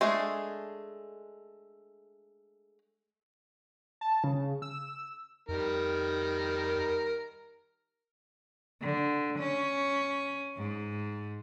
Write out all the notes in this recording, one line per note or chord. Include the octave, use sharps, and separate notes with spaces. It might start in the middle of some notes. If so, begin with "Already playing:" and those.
G#3 A3 D4 G#4
A5
C#3
E6
F2 D#3 G3 A#4
D3
C#4
G#2